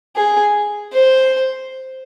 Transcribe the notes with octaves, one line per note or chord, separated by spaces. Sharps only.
G#4
C5